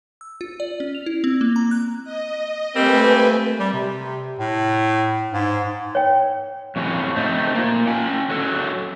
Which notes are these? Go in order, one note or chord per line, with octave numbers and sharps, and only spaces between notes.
E6
F4
D5
C#4
F7
E4
C4
A#3
A#5
F#6
D#5
G3 A3 A#3 C4 B4 G#5
G3
C3
A2
G#2
C#5 G5
F2 A2 C#4
A3 C4 D#4
A#3 F4
C#4 G5 G#5
F#3 A4